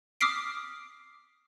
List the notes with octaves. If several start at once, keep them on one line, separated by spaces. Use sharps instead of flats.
D6 D#6 F6 B6 C7 D7